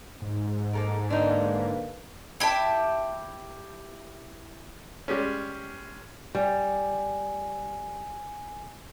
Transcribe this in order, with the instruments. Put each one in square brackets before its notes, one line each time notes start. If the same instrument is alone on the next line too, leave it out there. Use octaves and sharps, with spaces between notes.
[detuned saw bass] G#2
[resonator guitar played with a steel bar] A#3 A4 A#4
[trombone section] D3 A#3 B4 [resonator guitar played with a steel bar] D4 D#4
[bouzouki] E4 G4 E5 A5
[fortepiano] G3 G#3 C#4
[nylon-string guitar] G3 [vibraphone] G#5